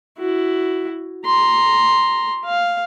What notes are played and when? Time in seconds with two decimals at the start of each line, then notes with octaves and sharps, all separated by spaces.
0.18 E4 F#4
1.26 A#5 C6
2.45 F5